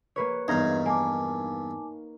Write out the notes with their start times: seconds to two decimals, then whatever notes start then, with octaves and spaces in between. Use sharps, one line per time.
0.16 A#3 B4 C#5
0.48 E2 G2 D#4 F5 A#5 G#6
0.86 A#3 G#5 A5 D6